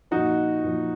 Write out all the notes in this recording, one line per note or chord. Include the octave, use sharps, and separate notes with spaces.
A#2 F3 D#4 F#4
A#2 F3